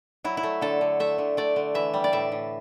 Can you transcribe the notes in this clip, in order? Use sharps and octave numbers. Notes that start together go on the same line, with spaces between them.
F#3 E4
E4
A3
D3 A4
D3
A3 E5
D3
A3 D5
D3
E3 E5
G3
D5
A2 E5
A2